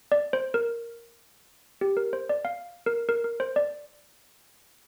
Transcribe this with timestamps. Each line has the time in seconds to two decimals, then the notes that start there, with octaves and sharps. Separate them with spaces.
0.12 D5
0.33 C5
0.54 A#4
1.81 G4
1.97 A#4
2.13 C5
2.29 D5
2.45 F5
2.86 A#4
3.09 A#4
3.24 A#4
3.40 C5
3.56 D5